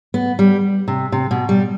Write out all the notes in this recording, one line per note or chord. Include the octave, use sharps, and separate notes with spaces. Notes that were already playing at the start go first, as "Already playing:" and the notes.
B3
G3
C3
C3
B2
G3